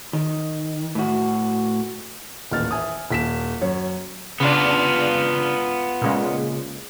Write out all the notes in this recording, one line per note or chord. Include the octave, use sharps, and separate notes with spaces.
D#3
A2 F#4
D#1 A1 F6 A6
E5 G#5 D#6
D#1 B6 E7
F#2 C#5
C#3 B3 D4 F4
A#2 C#3 G#3